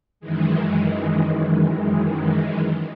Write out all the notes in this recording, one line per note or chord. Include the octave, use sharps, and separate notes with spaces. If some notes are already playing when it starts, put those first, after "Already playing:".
F#2 D#3 E3 G#3